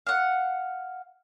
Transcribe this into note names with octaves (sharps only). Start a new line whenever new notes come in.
F5 F#5